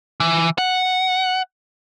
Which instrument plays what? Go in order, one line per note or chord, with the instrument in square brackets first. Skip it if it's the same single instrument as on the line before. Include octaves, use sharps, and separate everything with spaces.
[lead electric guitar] E3
F#5